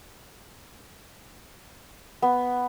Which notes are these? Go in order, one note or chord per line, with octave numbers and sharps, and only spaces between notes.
B3